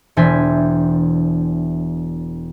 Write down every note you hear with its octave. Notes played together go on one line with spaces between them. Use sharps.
E1 E3 D4 C5 G#5 B6